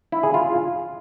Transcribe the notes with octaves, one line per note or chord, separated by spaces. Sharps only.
E4
G#4
F4